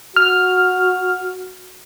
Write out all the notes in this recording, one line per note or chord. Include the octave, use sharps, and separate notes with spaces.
F#4 F6